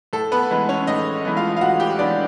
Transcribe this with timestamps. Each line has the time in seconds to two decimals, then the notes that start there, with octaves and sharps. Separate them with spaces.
0.13 A2 A4
0.32 B3 B4
0.51 E3 G#3 B3
0.69 C#4 C#5
0.87 A2 D#4 D#5
1.25 E3 G#3 B3
1.37 F4 F5
1.57 F5
1.61 A2 F#4 F#5
1.80 G4 G5
1.99 E3 G#3 B3 D4 D5